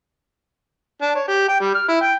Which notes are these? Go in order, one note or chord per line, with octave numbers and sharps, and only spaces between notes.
D4
C#5
G4
G5
G3
F6
E4
G5